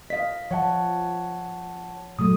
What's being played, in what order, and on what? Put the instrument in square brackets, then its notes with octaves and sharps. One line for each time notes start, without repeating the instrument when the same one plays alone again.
[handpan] D#5 F5 [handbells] B6
[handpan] F3 [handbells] C#5 F#5 A5
[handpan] A#2 F#3 A3 [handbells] D#6